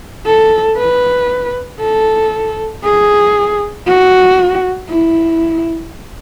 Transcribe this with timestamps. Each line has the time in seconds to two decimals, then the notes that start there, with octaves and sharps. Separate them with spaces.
0.26 A4
0.77 B4
1.81 A4
2.84 G#4
3.87 F#4
4.89 E4